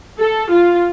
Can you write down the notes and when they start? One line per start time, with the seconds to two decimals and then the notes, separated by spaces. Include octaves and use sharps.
0.20 A4
0.52 F4